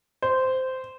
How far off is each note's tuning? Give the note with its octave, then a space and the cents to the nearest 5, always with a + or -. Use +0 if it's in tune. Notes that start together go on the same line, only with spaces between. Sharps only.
C5 -10